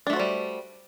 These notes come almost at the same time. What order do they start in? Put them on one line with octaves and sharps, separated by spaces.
D4 A3 F#4 C5 G3